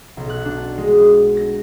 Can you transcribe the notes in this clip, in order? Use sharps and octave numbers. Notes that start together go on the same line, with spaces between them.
B1
F#6
D4
G#3
A#6